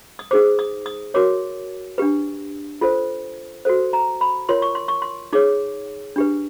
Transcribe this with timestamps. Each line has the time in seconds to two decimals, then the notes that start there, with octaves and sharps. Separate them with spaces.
0.19 D#6
0.31 D#4 G#4 C5 D6
0.59 D#6
0.86 D#6
1.14 F#4 A#4 C#5 D6
1.98 D4 G4 B4
2.81 F4 A4 C5
3.65 F#4 A4 C5
3.93 A#5
4.21 B5
4.49 F4 A#4 C#5 C6
4.62 C#6
4.75 C6
4.88 C#6
5.02 C6
5.33 D#4 G#4 C#5 D6
6.16 D4 G4 B4